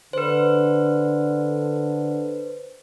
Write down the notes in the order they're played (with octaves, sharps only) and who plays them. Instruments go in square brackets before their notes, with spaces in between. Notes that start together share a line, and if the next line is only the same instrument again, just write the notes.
[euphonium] D3 [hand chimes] B4 C5